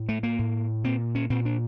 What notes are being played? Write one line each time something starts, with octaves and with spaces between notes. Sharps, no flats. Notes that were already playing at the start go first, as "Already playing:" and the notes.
Already playing: A2
A3
A#3
A2
A#2 C4
C#4
A#2 C4
D4